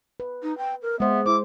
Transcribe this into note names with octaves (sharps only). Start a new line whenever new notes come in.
B4
D#4
G5
A#4
G#3 B3 C5 E5
E4 C5 D6